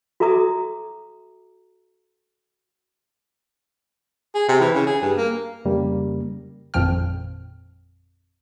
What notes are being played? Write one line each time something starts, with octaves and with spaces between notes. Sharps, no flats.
F#4 A4 E5 A#5 D6 D#6
G#4
C3
E3
C#3
G#4
G2
A#3
F2 C#3 G3 A#3
G#1 F2 A#2 F3 G5 F6